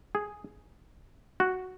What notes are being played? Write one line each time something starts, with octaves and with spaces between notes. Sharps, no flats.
G#4
F#4